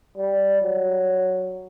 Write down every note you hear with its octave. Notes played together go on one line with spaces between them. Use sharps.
G3
F#3